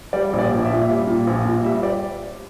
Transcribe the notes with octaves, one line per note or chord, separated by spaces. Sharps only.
G3 D5
A#1
D5
A#1
E5
A#2
G3
A#2
A#1
A#2
G3 E5
D5